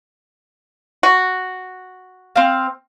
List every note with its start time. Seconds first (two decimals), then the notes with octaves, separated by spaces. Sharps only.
1.03 F#4
2.36 C4 F5